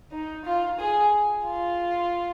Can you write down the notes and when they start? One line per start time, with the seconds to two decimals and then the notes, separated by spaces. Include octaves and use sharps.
0.12 D#4
0.45 F4
0.79 G#4
1.45 F4